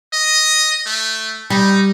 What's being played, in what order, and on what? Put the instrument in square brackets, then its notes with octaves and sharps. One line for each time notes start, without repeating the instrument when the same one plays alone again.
[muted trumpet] D#5
A3
[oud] G3 [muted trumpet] D#4